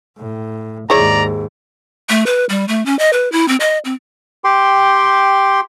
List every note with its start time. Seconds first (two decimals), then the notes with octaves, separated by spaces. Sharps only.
0.18 A2
0.90 D#2 G#2 E4 G#4 C#5 D5 A#5
2.09 A3
2.26 B4
2.49 G3
2.68 A3
2.86 C#4
2.99 D#5
3.13 B4
3.32 E4
3.48 C4
3.60 D#5
3.85 C4
4.44 G4 G5 C6